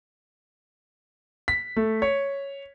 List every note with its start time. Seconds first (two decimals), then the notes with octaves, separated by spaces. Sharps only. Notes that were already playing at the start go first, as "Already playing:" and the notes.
1.48 B6
1.76 A3
2.02 C#5